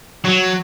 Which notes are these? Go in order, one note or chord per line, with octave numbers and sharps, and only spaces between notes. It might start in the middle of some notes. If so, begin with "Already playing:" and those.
F#3